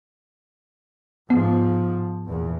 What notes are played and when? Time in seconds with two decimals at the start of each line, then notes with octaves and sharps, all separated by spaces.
1.30 G#2 F3 B3
2.27 A#1 E2